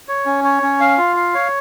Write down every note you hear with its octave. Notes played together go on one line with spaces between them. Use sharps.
C#5
C#4
C#5
C#4
F5
F4
F5
C#5